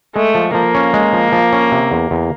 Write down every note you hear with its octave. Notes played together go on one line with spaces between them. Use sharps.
G#3 A3
F3
F3 A#3
C#4
G#3
F3
F3
C#4
C3
E2
E2